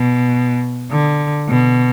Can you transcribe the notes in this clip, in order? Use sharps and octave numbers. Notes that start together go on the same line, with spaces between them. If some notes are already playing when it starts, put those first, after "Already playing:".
Already playing: B2
D3
B2